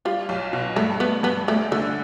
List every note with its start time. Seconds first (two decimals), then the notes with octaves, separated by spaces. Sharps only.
0.05 G3 F4
0.29 B1
0.53 B2
0.76 G2 A3
1.00 A3 B3
1.23 G2 B3
1.48 D2 A3
1.71 D3 A3